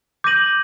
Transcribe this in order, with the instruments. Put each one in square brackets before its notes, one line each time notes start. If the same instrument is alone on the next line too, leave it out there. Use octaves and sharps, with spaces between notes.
[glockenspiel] D6 G6 A#6 D#7 F#7